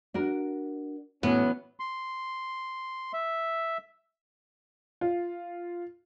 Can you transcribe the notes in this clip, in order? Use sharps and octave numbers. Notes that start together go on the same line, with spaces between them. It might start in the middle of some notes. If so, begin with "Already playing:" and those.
D4 F#4 A#4
A2 E3 F#3 B3 C#4
C6
E5
F4